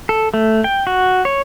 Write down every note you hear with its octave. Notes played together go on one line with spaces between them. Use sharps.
A4
A3
G5
F#4
C#5